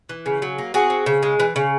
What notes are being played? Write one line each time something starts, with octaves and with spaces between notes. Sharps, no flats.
E3
C#3
F#3
A#3
C4 F#4 G#4
C4
C#3
G#3
E3
C#3